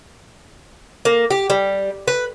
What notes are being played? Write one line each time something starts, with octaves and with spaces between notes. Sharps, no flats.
A#3
G4
G3
B4